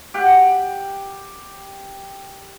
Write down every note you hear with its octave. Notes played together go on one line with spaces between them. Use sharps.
G4 F#5